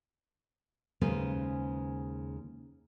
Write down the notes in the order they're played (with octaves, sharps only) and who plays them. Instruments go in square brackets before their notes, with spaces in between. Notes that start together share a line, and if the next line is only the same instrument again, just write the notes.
[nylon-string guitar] D#2 C#3 G#3 C#4 B4 C5